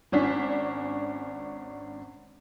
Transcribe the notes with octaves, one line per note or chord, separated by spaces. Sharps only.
G#1 C#4 D4 B6